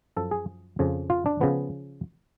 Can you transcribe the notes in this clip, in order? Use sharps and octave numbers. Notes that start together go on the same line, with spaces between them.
F#2 F3 A4
G#4
F2 C#3 F3
F4
D4
C#3 F3 B3